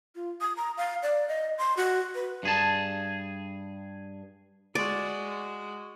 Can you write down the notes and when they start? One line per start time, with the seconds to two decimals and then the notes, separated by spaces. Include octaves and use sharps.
0.15 F4
0.41 D#6
0.57 A#5
0.77 F5
1.03 D5
1.28 D#5
1.58 C6
1.77 F#4
2.15 B4
2.43 G2 G#4 A5
4.75 G#3 F#4 D5